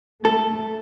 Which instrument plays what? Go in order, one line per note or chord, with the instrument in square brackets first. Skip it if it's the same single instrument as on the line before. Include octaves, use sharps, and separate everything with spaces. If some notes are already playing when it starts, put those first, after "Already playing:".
[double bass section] A3 [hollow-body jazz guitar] A4